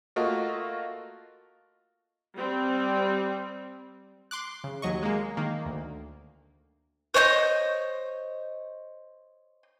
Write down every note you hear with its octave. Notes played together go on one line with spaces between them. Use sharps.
A3 A#3 F4 F#4 D#5
G3 C4
C6 D6 F#6
C#3
D#2 F#3 D#5 C#6
G#3 A#3
D#3 A#3
D2
C5 C#5 D#5 G6